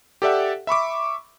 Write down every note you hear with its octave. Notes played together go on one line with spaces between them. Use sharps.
G4 A4 D5 E5 F#5
E5 B5 C#6 D6